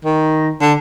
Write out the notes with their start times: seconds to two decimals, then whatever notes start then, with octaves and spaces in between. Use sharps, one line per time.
0.04 D#3
0.61 D3